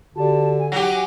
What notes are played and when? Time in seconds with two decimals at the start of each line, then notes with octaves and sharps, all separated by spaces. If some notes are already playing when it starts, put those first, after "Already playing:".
0.16 D3 F#4 G4 D5 A5
0.59 G#5
0.72 F#3 G4 A#6